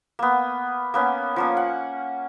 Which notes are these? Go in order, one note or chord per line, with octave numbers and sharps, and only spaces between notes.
A#3 B3
A#3 B3 C#4
F3 A#3 C#4
F#5